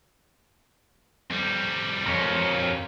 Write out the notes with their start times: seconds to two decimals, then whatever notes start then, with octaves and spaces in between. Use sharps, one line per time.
1.31 F2 G3
2.06 F2 A#4 C#5